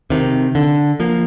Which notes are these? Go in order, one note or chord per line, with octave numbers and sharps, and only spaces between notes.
C3 D#3
D3
F3 A#3